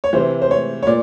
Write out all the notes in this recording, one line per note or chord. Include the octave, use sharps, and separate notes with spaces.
C#5
C3 E3 C5
C5
C#5
C#5
A#2 D5